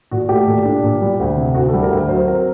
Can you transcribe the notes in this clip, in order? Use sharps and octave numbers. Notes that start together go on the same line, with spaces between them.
A#2 F#4
A3 G4
A#2
D4
A#2
G3
D2
C3
D2 F#4
G3 A4
A#4
D2
F#3 C5
C4 A#4